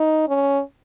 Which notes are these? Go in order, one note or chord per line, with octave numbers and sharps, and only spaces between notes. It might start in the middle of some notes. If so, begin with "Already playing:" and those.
Already playing: D#4
C#4